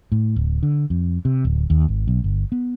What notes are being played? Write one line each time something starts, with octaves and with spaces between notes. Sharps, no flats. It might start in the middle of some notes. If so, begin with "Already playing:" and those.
A2
D1
D3
F2
C3
D1
D#2
G#1
B1
G1
B3